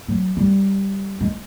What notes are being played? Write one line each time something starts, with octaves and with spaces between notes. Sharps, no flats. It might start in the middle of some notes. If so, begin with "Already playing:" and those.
F#3
G3
G#3